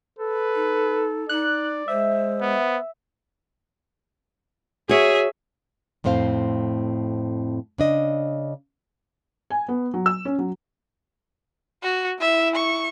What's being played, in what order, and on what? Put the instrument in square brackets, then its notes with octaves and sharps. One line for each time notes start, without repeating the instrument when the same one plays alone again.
[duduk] A4 [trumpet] B4
[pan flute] D#4
[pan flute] D#4 [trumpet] D5 [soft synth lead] F#6
[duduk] G#3 [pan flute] C5 [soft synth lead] E5
[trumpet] B3
[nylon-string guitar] F#4 C#5 [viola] G#4 E5
[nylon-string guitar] F2 A2 C4 C5 F5
C#3 D4 D#5
[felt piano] G#5
B3
F#3
E6
C#4
F#3
[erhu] F#4
[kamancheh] E4 [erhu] E5
[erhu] C#6